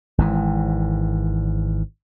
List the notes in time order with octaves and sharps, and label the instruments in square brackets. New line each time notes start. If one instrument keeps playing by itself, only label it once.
[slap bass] G#1 G#2 E3